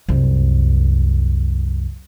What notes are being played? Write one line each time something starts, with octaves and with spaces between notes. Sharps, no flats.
C2 F#2